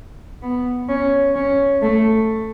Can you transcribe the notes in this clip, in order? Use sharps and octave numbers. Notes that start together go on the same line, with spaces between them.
B3
C#4
C#4
A3